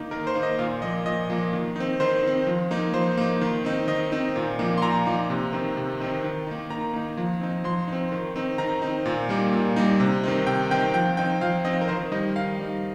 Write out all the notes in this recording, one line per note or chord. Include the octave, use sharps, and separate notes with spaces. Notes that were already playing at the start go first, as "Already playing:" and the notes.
Already playing: D#3 A#3 D#4
D#3 A#4
C5
A#3 D#4
D#5
A#2 F5
F3 A#3 D#5
A#2 D#5
F3 A#3
D#3
C4 D#4
D#3 C5
C4 D#4
F3
A#3 D#4
F3 C5
A#3 D#4
D#3
C4 D#4
D#3 D#5
C4 D#4
A#2
F3 A#3 D#4
C6
A#2 A#5
F3 A#3 D#4
C3
D#3 C4 D#4
C3
D#3 C4 D#4
D#3
A#3 D#4
D#3 A#5
A#3 D#4
F3
C4 D#4
F3 C6
C4 D#4
D#3
C4 D#4
D#3 A#5
C4 D#4
A#2
G3 A#3 D#4
A#2
G3 A#3 D#4
C3
D#3 C4 D#4
C3 G5
D#3 C4 D#4 G5
F3 G5
C4 D#4 G5
F3 F5
C4 D#4 D#5
A#4
D#3 C5
G3 D#4 D#5
D#3 F5
G3 D#4